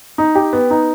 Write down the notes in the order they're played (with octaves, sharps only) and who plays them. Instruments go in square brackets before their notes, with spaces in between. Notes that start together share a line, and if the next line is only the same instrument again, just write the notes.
[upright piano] D#4
G4
B3
D#4